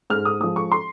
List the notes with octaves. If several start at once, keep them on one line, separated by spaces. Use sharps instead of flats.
G#2 F6
D#6
F3 G#3 D#6
C#6
C6